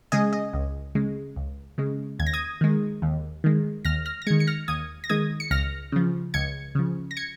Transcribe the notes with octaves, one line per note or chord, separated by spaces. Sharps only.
C#3 G#3 D#5 G#5
D#5
C#2
C#3 G#3
C#2
C#3 G#3
D#2 G#6
A#6
D#6 G#6
D#3 G#3
D#2
D#3 G#3
D#2 F6 A#6
F6 A#6
A#6
D#3 G#3 G#6 C#7
C#7
F6 A#6
D#2 D#6 G#6
A#6
D#3 G#3 D#6 G#6
C#7
C#2 F6 A#6
C#3 F3
C#2 G#6 C#7
C#3 F3
A#6
G#6 C#7